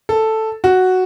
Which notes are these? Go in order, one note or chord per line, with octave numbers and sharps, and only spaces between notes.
A4
F#4